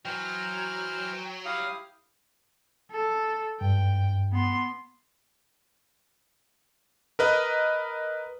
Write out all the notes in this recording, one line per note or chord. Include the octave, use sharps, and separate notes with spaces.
E3 F#3 C5 G5 F6
E4 G4 F5 D#6
A4
G2 G5
B3 C6
A#4 B4 D#5